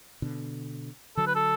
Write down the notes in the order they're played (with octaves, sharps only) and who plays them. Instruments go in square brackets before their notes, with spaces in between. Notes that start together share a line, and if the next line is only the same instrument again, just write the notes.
[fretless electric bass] B2 D3
[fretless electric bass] D3 F#3 [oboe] A4
[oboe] B4
A4